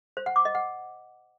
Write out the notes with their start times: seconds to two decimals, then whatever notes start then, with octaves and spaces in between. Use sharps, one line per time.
0.17 C5
0.26 F#5
0.36 D6
0.45 D#5
0.55 F#5